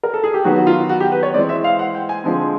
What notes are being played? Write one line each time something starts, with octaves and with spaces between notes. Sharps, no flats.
A#4
A4
G#4
G4
D#3 F#3 B3 F#4
F#4
F4
F#4
G4
B4
C#5
E3 G#3 C4 D5
E5
F5
F#5
G5
G#5
D3 F3 G#3 C4